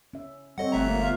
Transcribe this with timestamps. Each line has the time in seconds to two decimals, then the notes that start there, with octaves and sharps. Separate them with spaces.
0.14 C#4 E5
0.58 G3 C4 A4 C#5 D#5 F#5
0.72 G1 A3 E5 F#5 A#5
0.87 G#3 A#3 F4
1.02 B3 F4 F5